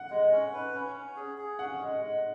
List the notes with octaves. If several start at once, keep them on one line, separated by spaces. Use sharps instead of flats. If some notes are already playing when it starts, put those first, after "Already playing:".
Already playing: F#5
G#3
C#4
B4
C#4
C#4
G#4
G#4
C#4 F#5
G#3
G#3